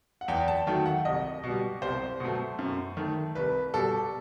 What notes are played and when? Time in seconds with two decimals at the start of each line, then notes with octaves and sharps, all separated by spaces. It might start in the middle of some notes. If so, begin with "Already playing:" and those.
0.21 F#5
0.28 E2 G5
0.48 A5
0.67 D#3 F#3 A3 G5
0.86 F#5
1.05 C2 D#5
1.44 B2 G3
1.82 C2 C5
2.20 B2 F#3 A3
2.59 F#2
2.97 D#3 A3
3.35 C2 B4
3.74 B2 G3 A4